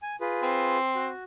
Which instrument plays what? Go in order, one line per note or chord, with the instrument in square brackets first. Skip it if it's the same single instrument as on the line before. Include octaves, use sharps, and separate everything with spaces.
[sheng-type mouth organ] G#5
F4 G#4 B4
[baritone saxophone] C4
[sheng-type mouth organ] F#4